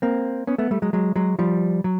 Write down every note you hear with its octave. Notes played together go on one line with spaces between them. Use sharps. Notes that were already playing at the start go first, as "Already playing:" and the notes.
A#3 C4
B3 C#4
A3 B3
G3 A3
F#3 G#3
F#3 G#3
F#3 G#3
F3 G3
F#3